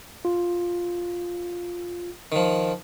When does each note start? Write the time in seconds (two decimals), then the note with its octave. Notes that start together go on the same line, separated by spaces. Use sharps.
0.25 F4
2.32 D#3 F3